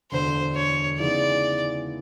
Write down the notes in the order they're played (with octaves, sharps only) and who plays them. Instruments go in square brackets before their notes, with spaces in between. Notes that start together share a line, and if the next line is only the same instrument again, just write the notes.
[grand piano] E1 D2 D3 [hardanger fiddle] C5
[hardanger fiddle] C#5
[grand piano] C#3 E3 G#3 B3 D#4 [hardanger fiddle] D5